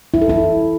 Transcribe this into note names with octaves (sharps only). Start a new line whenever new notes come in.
E4
A4
E4